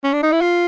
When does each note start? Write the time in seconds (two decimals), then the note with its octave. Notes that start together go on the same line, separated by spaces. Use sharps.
0.04 C#4
0.13 D4
0.23 D#4
0.32 E4
0.41 F4